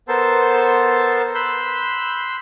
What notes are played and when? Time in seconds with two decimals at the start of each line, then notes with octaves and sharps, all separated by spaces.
0.08 B3 A4 A#4 C5 A5 C6
1.35 B5 C6 E6 F#6 G6